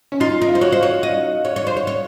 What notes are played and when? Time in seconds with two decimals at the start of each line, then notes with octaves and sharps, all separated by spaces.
0.12 C#4
0.20 D#4 F4
0.42 D#4 A#4
0.48 F4
0.55 C5
0.61 F#4 C#5
0.72 C5
0.83 C#5
1.03 D#5
1.45 C#5
1.56 C#5
1.67 C5
1.77 C#5
1.87 C#5